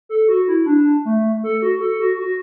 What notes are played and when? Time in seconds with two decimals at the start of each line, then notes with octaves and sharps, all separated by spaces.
0.09 A4
0.28 F#4
0.48 E4
0.66 D4
1.05 A3
1.44 A4
1.62 F#4
1.81 A4
2.00 F#4
2.19 F#4